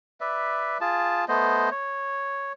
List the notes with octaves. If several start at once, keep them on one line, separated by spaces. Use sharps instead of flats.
B4 D5 E5
F4 G#4 A5
A3 B3 C5 D#5
C#5